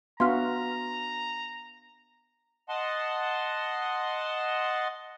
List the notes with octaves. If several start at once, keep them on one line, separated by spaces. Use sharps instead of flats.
B3 D4 F#4 E5 F5 A#5 C6 F6
D#5 F#5 A5 C6